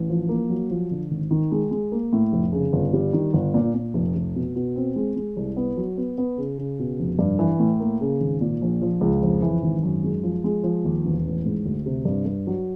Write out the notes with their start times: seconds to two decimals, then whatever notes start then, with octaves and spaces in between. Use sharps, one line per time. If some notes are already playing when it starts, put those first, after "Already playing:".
Already playing: A1
0.09 F3
0.29 A#3
0.50 F#3
0.70 F3
0.91 D3
1.11 G#1
1.31 D#3
1.52 G#3
1.71 G#3
1.92 A#3
2.13 A2
2.32 F1
2.53 C#3
2.73 G1
2.93 G3
3.13 D#3
3.33 G1
3.54 A#2
3.75 A#2
3.94 F1
4.15 F1
4.35 B2
4.56 B2
4.76 C4
4.96 G#3
5.16 G#3
5.37 C2
5.56 B3
5.77 F#3
5.97 B3
6.18 B3
6.38 C#3
6.58 C#3
6.79 B2
6.99 F1
7.19 G2
7.39 E3
7.59 A2
7.80 A#3
8.01 C#3
8.20 G#1
8.41 A#2
8.62 A#1
8.81 F3
9.01 C#2
9.22 F2
9.42 E3
9.63 G#1
9.83 F#2
10.03 G#3
10.23 F3
10.44 G#3
10.63 F3
10.85 D#2
11.05 E1
11.25 A1
11.46 G#2
11.65 D2
11.86 C3
12.05 G2
12.26 G2
12.47 F#3